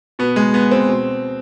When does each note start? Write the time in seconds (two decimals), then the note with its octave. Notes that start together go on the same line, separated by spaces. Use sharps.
0.19 B2 B3
0.36 G#3
0.54 B3
0.71 C4
0.89 B2